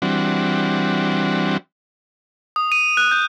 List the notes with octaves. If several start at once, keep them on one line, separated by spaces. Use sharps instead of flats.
E3 G3 C4 D4 F#4
D#6
D#7
F#6
G6